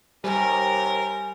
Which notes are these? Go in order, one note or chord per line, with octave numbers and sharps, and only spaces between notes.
D#2 C3 G3 A#4 G#5